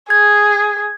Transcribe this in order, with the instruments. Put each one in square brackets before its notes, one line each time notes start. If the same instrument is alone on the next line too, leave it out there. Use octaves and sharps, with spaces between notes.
[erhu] G#4 [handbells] G#6